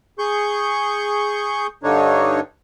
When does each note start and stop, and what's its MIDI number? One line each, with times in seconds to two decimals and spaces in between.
0.19 1.67 68
0.19 1.67 85
0.19 1.67 91
1.83 2.40 43
1.83 2.40 50
1.83 2.40 62
1.83 2.40 63
1.83 2.40 73